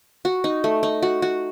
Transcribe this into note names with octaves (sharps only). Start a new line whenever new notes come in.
F#4
D#4
A3
D#4
F#4
F#4